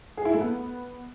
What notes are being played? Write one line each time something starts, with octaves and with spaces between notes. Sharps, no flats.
G#4
E4
A3
B3